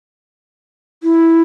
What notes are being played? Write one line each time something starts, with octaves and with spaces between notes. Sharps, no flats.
E4